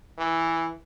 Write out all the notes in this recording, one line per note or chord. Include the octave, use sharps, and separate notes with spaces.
E3